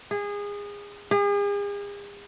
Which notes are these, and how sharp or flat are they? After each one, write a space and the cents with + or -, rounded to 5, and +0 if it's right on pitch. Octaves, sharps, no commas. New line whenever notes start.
G#4 -25
G#4 -40